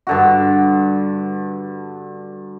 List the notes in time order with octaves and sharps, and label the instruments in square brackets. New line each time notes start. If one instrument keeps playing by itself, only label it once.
[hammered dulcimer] G2 D3 F#4